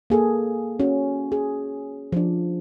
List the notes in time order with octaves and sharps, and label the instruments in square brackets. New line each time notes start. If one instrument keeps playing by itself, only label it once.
[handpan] A#3 G#4 A4
C#4 F#4
G#4
F3 D4